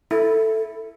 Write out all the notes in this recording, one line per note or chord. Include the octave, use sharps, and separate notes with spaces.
E4 A4